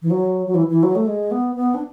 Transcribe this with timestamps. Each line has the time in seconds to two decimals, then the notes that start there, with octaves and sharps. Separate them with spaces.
0.02 E3
0.10 F#3
0.47 F#3
0.55 E3
0.69 E3
0.83 F#3
0.95 A3
1.07 G#3
1.31 B3
1.55 B3
1.74 D4